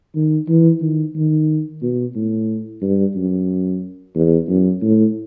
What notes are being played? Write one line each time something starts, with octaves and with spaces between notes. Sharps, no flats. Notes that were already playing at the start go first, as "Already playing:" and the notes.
D#3
E3
D#3
D#3
B2
A2
G2
F#2
E2
F#2
A2